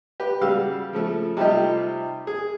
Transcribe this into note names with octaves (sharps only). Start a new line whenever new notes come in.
G4 B4
C#3 G3 F#4 F5 E6
C#3 F3 A3
C3 G3 A3 D#4 F4 G4
G#4